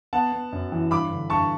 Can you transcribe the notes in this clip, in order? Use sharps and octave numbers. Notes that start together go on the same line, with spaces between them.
B3 F#5 A5
B3
F#2
E3
G2 B5 D6
D3
G2 A5 C#6